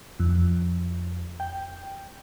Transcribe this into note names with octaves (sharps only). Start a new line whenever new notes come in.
F2
G5